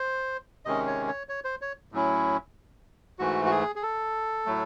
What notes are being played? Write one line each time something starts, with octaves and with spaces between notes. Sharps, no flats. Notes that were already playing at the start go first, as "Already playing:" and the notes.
Already playing: C5
C3 D#3 G#3 C#4 D#5
C#5
C#5
C#5
C5
C#5
A2 F#3 C#4 E4
G#2 E3 A3 F#4
F#4
G#4
G#4
A4
A2 F#3 A3